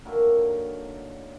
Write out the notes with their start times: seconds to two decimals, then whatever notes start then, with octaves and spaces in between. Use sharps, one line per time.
0.05 D3 D#3 F#3 A#3